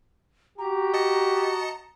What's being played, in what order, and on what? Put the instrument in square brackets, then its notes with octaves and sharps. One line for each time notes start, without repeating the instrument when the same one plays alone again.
[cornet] F#4 [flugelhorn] G4 [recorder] A#5
[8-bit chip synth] D#5 A5 C#7